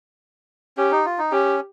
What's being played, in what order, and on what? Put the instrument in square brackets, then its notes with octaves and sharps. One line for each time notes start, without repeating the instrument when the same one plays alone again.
[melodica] C#4 [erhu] G4
[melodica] D#4
F4
D#4
[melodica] C#4 [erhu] G4